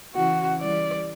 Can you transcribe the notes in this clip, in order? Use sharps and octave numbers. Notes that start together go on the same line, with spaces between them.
C#3 E3 F#4
E3 G3 D5